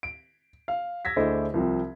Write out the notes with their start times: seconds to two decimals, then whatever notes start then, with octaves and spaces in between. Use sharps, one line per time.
0.03 D7
0.68 F5
1.05 E6 G#6 A#6 B6
1.16 D2 D3 E4 G#4 C5 D#5
1.54 C2 F3 C4